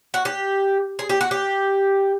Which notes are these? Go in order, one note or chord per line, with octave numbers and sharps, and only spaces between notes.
F#4
G4
G#4
G4
F#4
G4